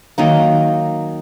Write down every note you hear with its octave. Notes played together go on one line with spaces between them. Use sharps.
D#3 F#3 A#3 D#4